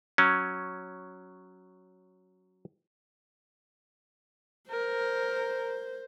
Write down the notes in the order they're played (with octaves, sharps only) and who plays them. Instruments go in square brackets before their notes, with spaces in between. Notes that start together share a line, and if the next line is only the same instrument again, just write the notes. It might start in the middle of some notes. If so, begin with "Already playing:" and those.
[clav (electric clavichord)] F#3 C#4
[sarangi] A#4 [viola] C5